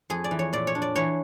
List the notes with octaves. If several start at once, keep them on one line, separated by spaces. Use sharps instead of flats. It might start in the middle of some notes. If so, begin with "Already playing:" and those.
F2 G#4
D5
E3
C#5
A#2 D5
C#5
D4
D5
E3 C#5